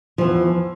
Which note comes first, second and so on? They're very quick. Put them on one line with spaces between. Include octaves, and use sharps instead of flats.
F3 E3 E2